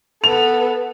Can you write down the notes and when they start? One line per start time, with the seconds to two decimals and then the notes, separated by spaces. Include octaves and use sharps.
0.24 B3 A4 F7